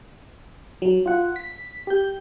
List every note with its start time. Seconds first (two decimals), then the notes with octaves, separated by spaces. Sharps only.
0.82 F#3
1.06 F4 F#5
1.36 B6
1.87 G4 G6